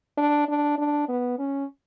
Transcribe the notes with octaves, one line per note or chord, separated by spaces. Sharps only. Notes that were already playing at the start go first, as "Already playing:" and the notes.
D4
D4
D4
B3
C#4